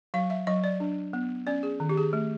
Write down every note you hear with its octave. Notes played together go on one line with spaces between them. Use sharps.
F#3 F5
E5
F#3 D#5
D5
D4
B3
C#4 D5
G#4
D#3
G4
G#4
A3